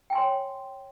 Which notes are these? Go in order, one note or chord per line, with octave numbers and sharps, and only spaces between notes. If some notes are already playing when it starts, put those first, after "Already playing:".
C#5 G5 G#5 C6